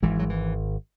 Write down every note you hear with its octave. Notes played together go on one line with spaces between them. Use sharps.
G#1 E3 G#3
F#3
E3